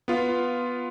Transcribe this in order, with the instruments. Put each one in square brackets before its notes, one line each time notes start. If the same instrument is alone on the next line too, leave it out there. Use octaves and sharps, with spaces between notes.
[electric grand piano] B3 F4